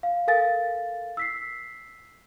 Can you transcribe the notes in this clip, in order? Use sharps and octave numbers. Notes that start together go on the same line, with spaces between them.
F5
A4 A#4 F5 G#5 A6
E6 B6 C7